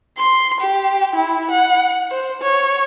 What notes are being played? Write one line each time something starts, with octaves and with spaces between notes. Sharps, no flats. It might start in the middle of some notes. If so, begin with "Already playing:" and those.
C6
G4
E4
F#5
C5
C#5